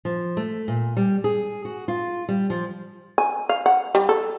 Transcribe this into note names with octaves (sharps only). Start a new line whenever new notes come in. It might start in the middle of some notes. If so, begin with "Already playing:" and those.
F3
A3
A#2
G3
G#4
F#4
F4
G3
F3
G#5
F5
F#5
G3
A4